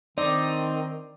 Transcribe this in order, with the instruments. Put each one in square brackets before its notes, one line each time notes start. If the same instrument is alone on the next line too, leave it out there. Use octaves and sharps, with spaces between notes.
[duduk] D#3 [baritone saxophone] C4 [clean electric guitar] D#4 [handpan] D5